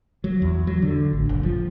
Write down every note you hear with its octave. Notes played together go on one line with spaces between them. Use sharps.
F#3
E2
F#3
D3
A1
F#1
F3